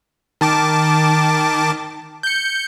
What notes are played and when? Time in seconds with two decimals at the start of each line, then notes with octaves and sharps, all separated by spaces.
0.41 D#3 A5 D6
2.23 G6 C#7